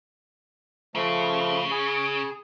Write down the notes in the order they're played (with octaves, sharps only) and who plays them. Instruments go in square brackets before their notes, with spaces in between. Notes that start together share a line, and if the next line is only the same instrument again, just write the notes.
[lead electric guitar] C#3 [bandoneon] F3 A3
[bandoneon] G#4